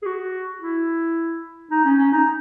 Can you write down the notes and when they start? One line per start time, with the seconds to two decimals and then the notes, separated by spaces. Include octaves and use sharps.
0.02 G#4
0.06 F#4
0.62 E4
1.71 D#4
1.85 C#4
1.98 C#4
2.12 D#4